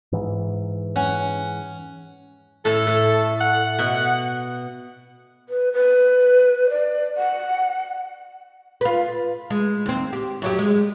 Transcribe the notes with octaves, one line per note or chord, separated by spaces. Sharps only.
G#2 E3
C#4 F#5
A2 A4 A5
A2
F#5
B2
B4
B4
D5
F#5
F4 B4
G#3
D#2 C4
G4
F#2 F#3 G4
G#3